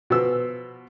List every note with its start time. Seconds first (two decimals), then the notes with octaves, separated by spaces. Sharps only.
0.10 B2 F3 B3 E6